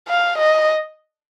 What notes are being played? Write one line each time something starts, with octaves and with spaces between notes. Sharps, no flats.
F5
D#5